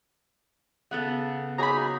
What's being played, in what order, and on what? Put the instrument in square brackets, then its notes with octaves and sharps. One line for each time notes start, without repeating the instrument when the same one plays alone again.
[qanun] C#3 B3 A4 [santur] F#5
[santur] F#3 A#3 D#4 [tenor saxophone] G#4 [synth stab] A#5 B5